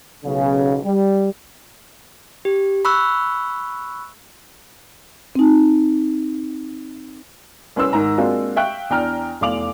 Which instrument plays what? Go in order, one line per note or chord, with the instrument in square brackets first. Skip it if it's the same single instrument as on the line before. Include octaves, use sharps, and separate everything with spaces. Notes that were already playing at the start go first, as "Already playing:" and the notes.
[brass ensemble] B1 C#3
G3
[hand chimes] G4
B5 C#6 E6 F#6
[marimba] C4 D#4
[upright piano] C2 C#4 B4 C6 E6
G#2 D#3 A#5
G#3 A#3 C4 D4 F4 F#4
E5 F5 G5 C#6 F#6
E2 D4 G5 A#5 F6
F1 E2 F5 D6 F7 F#7